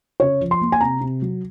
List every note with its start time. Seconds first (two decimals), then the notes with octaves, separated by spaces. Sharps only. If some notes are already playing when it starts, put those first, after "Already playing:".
0.20 C#3 C#5
0.41 F3
0.51 C6
0.61 A#3
0.72 G#5
0.81 C3 A#5
1.01 C3
1.22 F#3